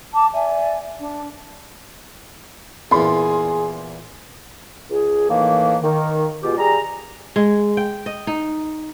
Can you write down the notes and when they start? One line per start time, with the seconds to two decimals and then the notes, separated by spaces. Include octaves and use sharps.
0.12 A5 D6
0.31 D5 E5 G#5
0.99 D4
2.91 E2 A#2 G#4 C6
4.91 C#2 G#4
5.30 A2 D#3 E3 A#3
5.83 D#3
6.43 B2 G#3 F4 G4
6.58 G3 G#4 A#5
7.36 G#3
7.77 G5
8.06 D#5
8.27 D#4